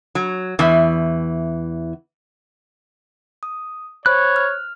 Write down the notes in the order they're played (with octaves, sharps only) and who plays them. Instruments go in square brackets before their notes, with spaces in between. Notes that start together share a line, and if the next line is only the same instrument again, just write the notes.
[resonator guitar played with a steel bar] F#3
E2 E3
[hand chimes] D#6
[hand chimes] C5 B5 [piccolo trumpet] C#5 [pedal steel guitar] F#6
[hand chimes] F6